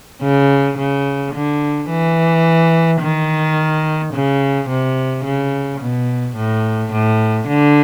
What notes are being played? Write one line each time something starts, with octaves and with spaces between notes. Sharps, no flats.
C#3
C#3
D3
E3
D#3
C#3
C3
C#3
B2
A2
A2
D3